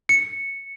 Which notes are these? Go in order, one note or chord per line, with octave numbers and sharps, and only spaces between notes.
C#7